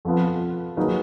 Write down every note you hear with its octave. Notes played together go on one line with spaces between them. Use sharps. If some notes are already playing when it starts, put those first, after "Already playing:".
F2 F3 B3 F4
F#3 A#3 D#4 G#4 B4